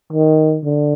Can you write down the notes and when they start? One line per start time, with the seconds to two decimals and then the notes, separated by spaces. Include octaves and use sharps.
0.12 D#3
0.64 D3